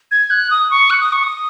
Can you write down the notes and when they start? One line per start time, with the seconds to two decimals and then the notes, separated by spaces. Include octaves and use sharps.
0.11 G#6
0.30 F#6
0.51 D#6
0.71 C#6
0.90 F#6
1.01 D#6
1.12 C#6
1.24 D#6